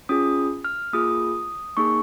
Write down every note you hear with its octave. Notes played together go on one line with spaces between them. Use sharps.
C#4 F4 G#4 D#6
F6
A#3 F4 G#4 D#6
A#3 D#4 G#4 C#6